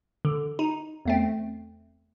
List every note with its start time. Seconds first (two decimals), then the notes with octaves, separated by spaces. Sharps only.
0.25 D3
0.59 D#4
1.05 E2 A3 C4